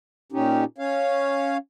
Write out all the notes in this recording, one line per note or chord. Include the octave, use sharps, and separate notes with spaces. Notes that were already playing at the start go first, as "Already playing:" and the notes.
A#2 C#4 D#4 G4
C#4 C#5 F5